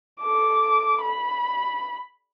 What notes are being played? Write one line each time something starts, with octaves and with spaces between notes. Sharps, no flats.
A4 D6
B5